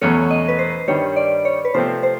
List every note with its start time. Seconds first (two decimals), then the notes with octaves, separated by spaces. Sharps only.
0.01 E2 B2 F#3 A3 C#4 C#5
0.31 D#5
0.48 B4
0.59 C5
0.88 G2 D#3 G3 C#5
1.16 D5
1.45 C#5
1.65 B4
1.74 C3 F3 A3 C4 C5
2.03 C5